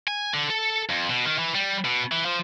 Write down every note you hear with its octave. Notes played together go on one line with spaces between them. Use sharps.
G#5
D3
A4
F2
B2
D#3
E3
G3
B2
E3
F3